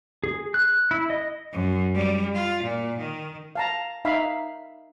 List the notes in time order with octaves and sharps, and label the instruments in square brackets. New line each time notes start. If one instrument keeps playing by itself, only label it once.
[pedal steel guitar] G#4
F#6
E4
D#5
[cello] F#2
G3
F4
A#2
D#3
[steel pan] F5 A5 A#5
D#4 E5 F5 B5